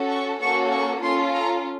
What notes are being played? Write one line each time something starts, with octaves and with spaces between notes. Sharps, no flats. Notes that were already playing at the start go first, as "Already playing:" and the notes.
Already playing: C#4 F#4 A4
C#6
A#3 C#4 F#4 A4 C#6
C#6
C#4 F4 A4 C6
A#5